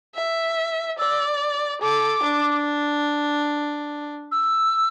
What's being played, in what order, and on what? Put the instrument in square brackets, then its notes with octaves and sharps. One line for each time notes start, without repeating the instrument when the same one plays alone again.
[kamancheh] E5
[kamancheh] D5 [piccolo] E6
[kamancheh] A4 [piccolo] D6
[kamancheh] D4
[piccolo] E6